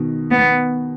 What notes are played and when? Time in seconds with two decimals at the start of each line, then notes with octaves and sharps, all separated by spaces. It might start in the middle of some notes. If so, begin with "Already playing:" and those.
Already playing: B2 D#3
0.31 B3